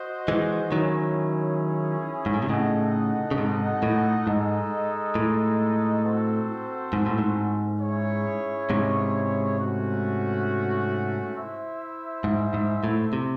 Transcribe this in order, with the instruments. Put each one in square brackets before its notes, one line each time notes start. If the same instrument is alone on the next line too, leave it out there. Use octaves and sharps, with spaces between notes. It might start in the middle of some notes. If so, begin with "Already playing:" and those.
Already playing: [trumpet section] F#4 C5 D#5
[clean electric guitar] E3 G#3
[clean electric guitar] D#3 F#3 [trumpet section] C#4 E4 G#4 C#5
[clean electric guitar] G#2
A2
C3
[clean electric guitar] A2 C#3 [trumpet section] D#4 A4 D#5 F#5
[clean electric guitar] C#3
G#2 C3
A2
[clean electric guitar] G#2 [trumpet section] G#3 D#4 A4 D#5
[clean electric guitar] A2
[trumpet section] C4 F#4 A4 C5
[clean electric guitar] G#2
A2
G#2
[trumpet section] C#4 E4 G#4 C#5
[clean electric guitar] G#2 C3
[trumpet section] A3 C#4 F#4
E4 C5 E5
[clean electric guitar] G#2
G#2
A2
C3